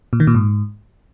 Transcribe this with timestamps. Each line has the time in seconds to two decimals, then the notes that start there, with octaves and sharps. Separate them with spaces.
0.13 A#2
0.20 D#3
0.27 A#2
0.35 G#2